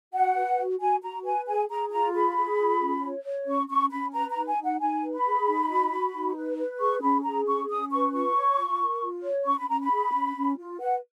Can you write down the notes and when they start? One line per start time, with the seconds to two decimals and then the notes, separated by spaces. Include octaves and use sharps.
0.13 F#4 F#5
0.36 B4
0.58 F#4
0.80 F#4 G#5
1.02 F#4 A#5
1.24 B4 G#5
1.47 G#4 G#5
1.70 G#4 A#5
1.91 F4 A#5
2.14 G#4 B5
2.36 G#4
2.59 F4
2.80 C#4
3.03 C#5
3.24 C#5
3.47 C#4 C#6
3.69 C#4 C#6
3.91 C#4 B5
4.14 B4 A#5
4.30 A#5
4.36 D#4
4.47 G#5
4.58 D#4
4.64 F#5
4.80 D#4 G#5
5.02 B4
5.14 B5
5.25 G#4
5.47 D#4
5.70 F#4
5.91 F#4
6.14 D#4
6.36 B4
6.58 B4
6.80 G#4 C#6
7.02 C#4 B5
7.24 G#4 A#5
7.46 C#4 C#6
7.69 C#4 D#6
7.91 B4 C#6
8.13 F4 C#6
8.36 C#5
8.58 F4
8.80 A#4
9.02 F4
9.24 C#5
9.46 C#4 C#6
9.59 B5
9.69 C#4 A#5
9.82 B5
9.91 G#4
10.13 C#4
10.36 C#4
10.58 F4
10.79 B4 F#5